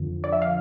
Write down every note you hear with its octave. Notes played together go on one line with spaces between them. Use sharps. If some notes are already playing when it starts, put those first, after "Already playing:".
Already playing: F2 D3 F3
D5
E5
F5